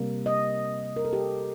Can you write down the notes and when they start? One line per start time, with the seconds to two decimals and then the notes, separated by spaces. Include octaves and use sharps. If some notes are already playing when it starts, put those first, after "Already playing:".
Already playing: C3 G3 A#3
0.26 D#5
0.96 A#4
1.05 A4
1.13 G4